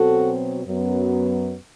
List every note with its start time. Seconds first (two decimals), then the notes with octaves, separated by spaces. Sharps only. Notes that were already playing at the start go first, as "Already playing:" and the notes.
Already playing: B2 F#3 C4 F#4 A4
0.65 F#2 F#3 B3